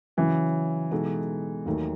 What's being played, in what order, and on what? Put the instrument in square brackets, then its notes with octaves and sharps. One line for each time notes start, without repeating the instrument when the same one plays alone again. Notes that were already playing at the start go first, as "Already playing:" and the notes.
[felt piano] C#3 F#3 C#4 [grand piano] E3
[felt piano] B2 G#3 D#4 F#4 A4
D#2 D#3 F#3 A3 D#4